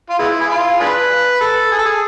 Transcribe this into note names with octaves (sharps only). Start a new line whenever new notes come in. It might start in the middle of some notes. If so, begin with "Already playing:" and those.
F4
G#3 B3 E4
G#4
F4
D4 G#4 B4
A4
G#4
A4
G#4